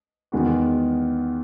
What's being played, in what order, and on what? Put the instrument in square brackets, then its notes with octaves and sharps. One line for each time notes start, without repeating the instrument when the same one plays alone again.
[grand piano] E2 D#3 G#3 B3 F#4